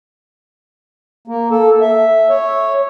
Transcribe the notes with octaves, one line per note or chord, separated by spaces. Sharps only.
A#3
A4
E5
C#5